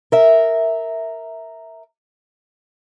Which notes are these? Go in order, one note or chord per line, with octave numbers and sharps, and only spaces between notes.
A#4 E5